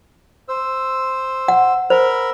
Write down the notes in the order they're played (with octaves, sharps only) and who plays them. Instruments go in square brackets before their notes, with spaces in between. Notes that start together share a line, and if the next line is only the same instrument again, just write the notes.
[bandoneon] C5 E6
[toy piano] F#5
[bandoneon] A#4 B5 E6 [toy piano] C5